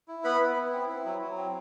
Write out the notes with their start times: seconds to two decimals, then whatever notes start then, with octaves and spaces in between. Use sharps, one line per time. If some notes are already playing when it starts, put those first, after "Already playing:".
0.08 E4
0.24 B3 B4 B5
0.40 B3
0.56 E4
0.73 C4
0.89 E4
1.05 F#3
1.21 F#3
1.38 C4